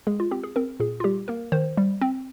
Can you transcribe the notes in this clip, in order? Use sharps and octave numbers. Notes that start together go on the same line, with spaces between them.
G#3 G#4
F4
C4 G4
G#4
C4 A#4
A#2 G#4
F4
G3 G4
A#3 A#4
D#3 C5
G3
C4